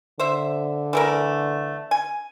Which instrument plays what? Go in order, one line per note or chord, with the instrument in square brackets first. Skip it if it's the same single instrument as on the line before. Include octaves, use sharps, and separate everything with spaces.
[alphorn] D3 [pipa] C5 E5
[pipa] E3 A3 A#4
G#5